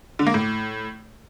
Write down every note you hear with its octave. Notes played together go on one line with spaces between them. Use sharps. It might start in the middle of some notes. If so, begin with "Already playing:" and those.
D3
A#3
A2